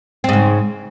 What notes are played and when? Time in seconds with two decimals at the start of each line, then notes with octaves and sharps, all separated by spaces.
0.24 C4
0.29 G#2
0.33 C#3